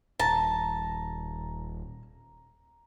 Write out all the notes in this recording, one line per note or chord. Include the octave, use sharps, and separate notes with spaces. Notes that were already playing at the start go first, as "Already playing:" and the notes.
D#1 A5 A#5